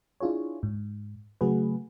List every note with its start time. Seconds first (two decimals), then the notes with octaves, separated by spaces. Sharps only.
0.21 D4 E4 F4 G#4 C#5
0.63 G#2
1.41 C#3 F#3 A3 F#4 G#4 B4